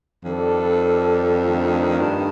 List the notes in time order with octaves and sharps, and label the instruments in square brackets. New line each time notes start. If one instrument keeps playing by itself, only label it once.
[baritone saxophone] F2 [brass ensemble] D#3 G3 D4 A4
[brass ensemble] D#3 A3 D4
[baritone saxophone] G2